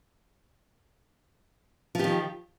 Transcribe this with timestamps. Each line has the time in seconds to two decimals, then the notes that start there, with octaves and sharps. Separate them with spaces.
1.95 F3
1.99 G4
2.04 D#3